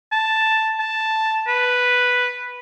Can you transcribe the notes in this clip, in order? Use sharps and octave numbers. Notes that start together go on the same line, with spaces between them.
A5
A5
B4